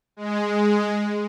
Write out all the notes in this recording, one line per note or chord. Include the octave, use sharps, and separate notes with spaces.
G#3